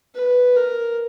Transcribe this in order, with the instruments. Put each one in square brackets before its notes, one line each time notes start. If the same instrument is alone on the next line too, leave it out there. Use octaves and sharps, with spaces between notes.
[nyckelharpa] B4
A#4